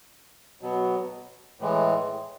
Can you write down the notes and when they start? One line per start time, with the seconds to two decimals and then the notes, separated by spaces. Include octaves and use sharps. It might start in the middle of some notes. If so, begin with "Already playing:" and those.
0.61 B2 F#3 B3
1.60 A2 E3 G#3